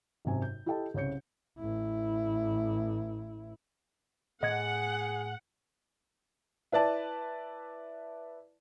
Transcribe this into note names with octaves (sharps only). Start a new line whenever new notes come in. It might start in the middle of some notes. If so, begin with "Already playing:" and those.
G#1 F#2 C3 G#5
G6
E4 G4 A4 D#5 G5 A5
C2 C#3 C#5 G6 C#7
A1 E4
A2 G#4 D#5 F#5 G#6
E4 B4 D5 A5